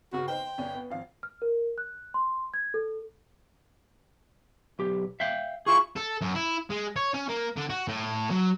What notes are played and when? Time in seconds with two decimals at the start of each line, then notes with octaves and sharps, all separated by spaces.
0.13 G1 C#3 F#4
0.28 D#4 C5 G5 C6
0.58 G1 C#4 D4
0.75 B3
0.90 G#1 F3 F5
1.23 F6
1.42 A#4
1.78 F#6
2.14 C6
2.54 G#6
2.74 A4
4.79 B1 G4
5.20 E5 F5 G5
5.66 E4 F4 G#4 C#6
5.96 A4
6.21 F#2
6.35 E4
6.70 G#3
6.96 C#5
7.14 C#4
7.29 A#3
7.57 D3
7.70 F#4
7.88 A2
8.31 F#3